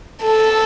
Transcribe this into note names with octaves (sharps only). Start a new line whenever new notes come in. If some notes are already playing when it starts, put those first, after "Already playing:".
A4